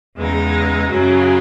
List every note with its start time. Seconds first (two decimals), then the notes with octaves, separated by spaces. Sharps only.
0.17 E2 C#3 G#3 D#4
0.89 F#2 C#3 F#3 C#4